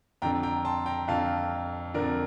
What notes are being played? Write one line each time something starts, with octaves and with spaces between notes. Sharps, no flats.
F2 D3 G5 A#5
G5 A#5
A5 C6
G5 A#5
F2 D3 F5 A5
F2 D3 A#4 D5